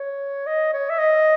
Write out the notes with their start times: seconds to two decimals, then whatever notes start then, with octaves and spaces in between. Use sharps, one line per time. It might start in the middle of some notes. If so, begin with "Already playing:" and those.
Already playing: C#5
0.46 D#5
0.73 C#5
0.89 E5
0.99 D#5